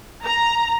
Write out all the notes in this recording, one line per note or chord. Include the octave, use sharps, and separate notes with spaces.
A#5